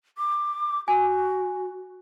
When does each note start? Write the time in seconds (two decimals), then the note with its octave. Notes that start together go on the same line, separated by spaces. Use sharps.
0.18 D6
0.88 F#4 G#5